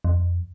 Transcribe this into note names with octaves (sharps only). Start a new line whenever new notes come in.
F2